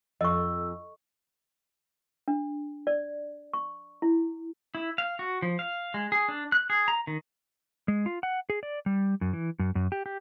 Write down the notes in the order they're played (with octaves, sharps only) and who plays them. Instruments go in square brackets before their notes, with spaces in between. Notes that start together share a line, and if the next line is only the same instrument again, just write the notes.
[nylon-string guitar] F2 [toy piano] D#5 C#6 [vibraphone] E6
[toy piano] D4
D5
C#6
E4
[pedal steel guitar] E4
F5
F#4
F3
F5
G#3
G#4
D4
F#6
G#4
A#5
D#3
[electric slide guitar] G#3
F4
F#5
G#4
D5
G3
F#2
E3
F#2
F#2
G4
G4